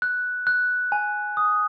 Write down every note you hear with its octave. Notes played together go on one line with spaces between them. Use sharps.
F#6
F#6
G#5
D#6